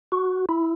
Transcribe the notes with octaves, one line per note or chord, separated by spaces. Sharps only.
F#4
E4